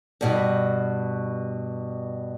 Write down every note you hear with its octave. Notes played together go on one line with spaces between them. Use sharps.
G2 B2 G3